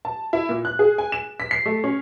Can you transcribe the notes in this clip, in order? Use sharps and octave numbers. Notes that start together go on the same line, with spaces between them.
A5
E4
A#2
F#6
G#4
G#5
E7
B6
C7
A3
C#4